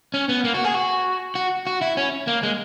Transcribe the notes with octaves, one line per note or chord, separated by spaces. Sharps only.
C#4
B3
A#3
F#4
G#4
F#4
F#4
F#4
E4
C#4
A#3
G#3